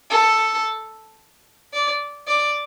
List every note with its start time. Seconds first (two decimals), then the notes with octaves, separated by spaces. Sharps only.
0.10 A4
1.73 D5
2.27 D5